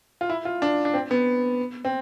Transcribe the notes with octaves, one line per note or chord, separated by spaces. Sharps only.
F4
E4
F4
D4
D4
C4
B3
C4